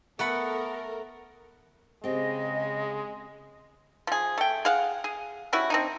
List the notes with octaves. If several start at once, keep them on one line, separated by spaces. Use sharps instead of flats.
A3 B3 A4 A#4 F#5 B5
C#3 G#3 C4 G4 D#5
F3 G#4
A3 G5
G#4 F5 F#5
G#4
G3 C#4 E4 F#4
C4 D4 D#4